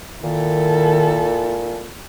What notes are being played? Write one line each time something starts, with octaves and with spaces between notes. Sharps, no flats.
A#2 D#3 E4 A4